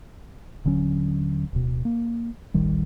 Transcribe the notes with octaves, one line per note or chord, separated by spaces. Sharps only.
D#1 D3 F#3 C#4
D1 B2
A#3
D#1 A1 D#3 G3